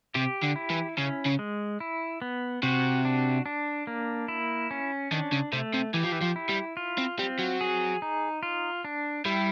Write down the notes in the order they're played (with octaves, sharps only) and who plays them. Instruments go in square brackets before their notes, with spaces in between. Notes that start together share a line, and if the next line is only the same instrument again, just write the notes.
[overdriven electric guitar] C3 [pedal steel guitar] G4
[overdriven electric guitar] D3
[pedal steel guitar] E4
[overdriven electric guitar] E3
[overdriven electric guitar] C#3 [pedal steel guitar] C#4
[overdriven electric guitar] C#3
[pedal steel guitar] G#3
E4
B3
[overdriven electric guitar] C3 [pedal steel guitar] F#4
[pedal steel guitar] D4
D4
A#3
E4
C#4
[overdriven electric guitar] D#3 [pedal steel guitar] D4
[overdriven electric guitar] C#3
[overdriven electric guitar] C3 [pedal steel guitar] A3
[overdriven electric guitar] C3
[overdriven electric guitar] E3 [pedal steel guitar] G4
[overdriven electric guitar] F3
E3
F3
[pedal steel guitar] E4
[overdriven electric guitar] G3
[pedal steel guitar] F4
[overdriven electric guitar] C4
[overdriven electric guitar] G3 [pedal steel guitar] C4
[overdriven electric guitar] F#3
[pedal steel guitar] G#4
D#4
F4
D4
[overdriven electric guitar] G3 [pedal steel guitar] E4